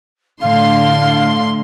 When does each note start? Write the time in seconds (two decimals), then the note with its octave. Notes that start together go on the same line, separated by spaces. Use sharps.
0.41 A2 D3 F5 C6